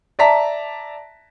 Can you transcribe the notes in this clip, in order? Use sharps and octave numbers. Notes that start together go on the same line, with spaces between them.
D5 E5 A5 A#5 B6